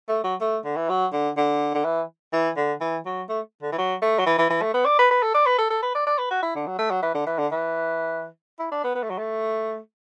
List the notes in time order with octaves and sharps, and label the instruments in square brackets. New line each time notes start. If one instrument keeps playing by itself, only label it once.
[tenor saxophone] A3
F#3
A3
D3
E3
F#3
D3
D3
D3
E3
E3
D3
E3
F#3
A3
D3
E3
F#3
A3
F#3
E3
E3
E3
A3
B3
D5
B4
B4
A4
D5
B4
A4
A4
B4
D5
D5
B4
F#4
E4
D3
F#3
A3
F#3
E3
D3
E3
D3
E3
E4
D4
B3
B3
A3
F#3
A3